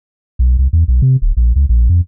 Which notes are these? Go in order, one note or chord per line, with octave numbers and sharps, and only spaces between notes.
B1
C2
E2
B1
C3
D1
A#1
C#2
A#1
F2